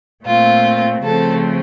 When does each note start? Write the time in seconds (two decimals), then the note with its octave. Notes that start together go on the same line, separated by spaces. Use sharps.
0.25 A#2 A3 C4 F4
1.04 C#3 F3 A3 C4 A4